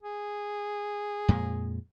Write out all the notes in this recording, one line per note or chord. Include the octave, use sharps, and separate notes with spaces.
G#4
F2 A#2 G#3